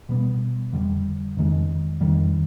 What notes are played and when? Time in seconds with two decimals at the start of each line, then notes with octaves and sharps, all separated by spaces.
0.09 B2 G3 B3
0.73 F2 D3 G3
1.37 F2 D#3 G#3
2.01 F2 D#3 G3